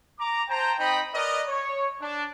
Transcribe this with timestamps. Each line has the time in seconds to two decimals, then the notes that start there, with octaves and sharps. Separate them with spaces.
0.19 A#5 D6
0.48 C5 G5 A5 A#5
0.78 C4 D#4 D#5 G5 B5
1.14 A#4 B4 D5 D#5
1.47 C#5
2.01 D4